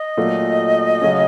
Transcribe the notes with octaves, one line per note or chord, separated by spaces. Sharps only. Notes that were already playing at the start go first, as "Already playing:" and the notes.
Already playing: D#5
A#2 F#3 A3
C#3 F#3 A3 C#4